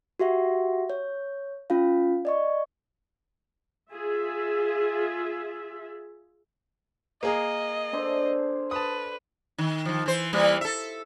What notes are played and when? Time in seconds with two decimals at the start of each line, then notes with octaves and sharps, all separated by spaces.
0.19 F#4 G4 E5 F#5
0.90 C#5
1.70 C#4 F4 F5
2.25 D5 D#5 C#6
3.90 F4 G#4 E5
7.23 A#3 G#4 A#4 D#5
7.93 D4 A4 C5
8.71 B4 A5 D#6
9.58 D#3
9.85 D#3 F3
10.06 E3 C5
10.33 E3 G3 A#3
10.61 A4 E5